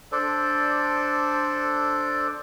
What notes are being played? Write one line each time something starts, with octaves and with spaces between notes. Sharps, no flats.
D4 A4 C5 D5